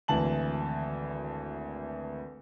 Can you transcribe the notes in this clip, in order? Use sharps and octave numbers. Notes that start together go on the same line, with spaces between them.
G#1 D2 E3 A5 F#7